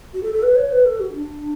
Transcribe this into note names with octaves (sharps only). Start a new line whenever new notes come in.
F#4
A4
A4
B4
C#5
B4
A4
F#4
D4